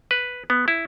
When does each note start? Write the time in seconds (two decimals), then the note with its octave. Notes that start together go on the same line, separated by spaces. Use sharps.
0.11 B4
0.50 B3
0.68 E4